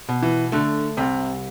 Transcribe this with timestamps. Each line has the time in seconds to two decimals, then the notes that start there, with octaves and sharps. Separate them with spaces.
0.09 B2
0.22 E3
0.52 D3 A3
0.97 C2 C3